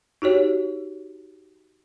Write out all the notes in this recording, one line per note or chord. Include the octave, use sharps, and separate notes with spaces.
D#4 F#4 G4 C#5